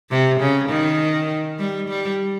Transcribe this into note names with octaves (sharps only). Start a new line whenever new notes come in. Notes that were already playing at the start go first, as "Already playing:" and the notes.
C3
C#3
D#3
G3
G3